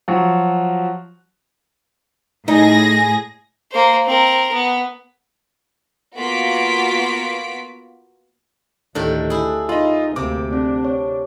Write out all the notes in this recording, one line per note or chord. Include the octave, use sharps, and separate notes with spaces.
F3 F#3 F#4
A2 D#4 G#4 A#6
A#3 C5
C4 A#4
B3
A#3 B3 F4 F#4 B6 D7
D2 A2 D#3 D4 G4
E4 G#4
D#4 F4 D#5 B5
D2 C3 A#3 D6
C4 D4
C#5